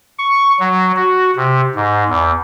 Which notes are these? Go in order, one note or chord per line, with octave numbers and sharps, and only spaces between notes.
C#6
F#3
F#4
C3
G#2
E2